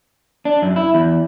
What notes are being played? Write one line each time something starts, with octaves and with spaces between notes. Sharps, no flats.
D4
F#2
E4
E2